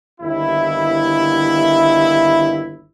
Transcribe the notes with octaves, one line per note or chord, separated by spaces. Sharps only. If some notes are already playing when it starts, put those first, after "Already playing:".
G1 D#2 E4